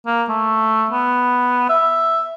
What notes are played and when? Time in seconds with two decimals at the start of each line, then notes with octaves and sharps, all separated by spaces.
0.06 A#3
0.29 A3
0.91 B3
1.70 E5